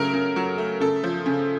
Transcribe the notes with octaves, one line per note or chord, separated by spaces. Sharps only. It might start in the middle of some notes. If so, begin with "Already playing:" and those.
Already playing: C#3 F#3 A3 A#4
C#3
F#3
A3
C#3 A4
F3
C#3